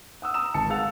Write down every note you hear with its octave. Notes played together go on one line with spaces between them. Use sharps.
F#5 D#6 E6
A#5 D#6 E7
G#1 A5 C#7
G#3 F5 F#5 E6 A6 F7